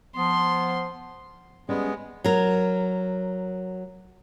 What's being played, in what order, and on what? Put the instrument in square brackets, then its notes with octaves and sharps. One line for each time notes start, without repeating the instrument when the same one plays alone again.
[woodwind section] F3 B3 [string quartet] C6
[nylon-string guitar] G3 C#4 D5 [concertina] G#3 B3
[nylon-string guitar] F#3 A#4